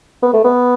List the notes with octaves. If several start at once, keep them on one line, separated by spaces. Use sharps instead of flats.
B3
A3
B3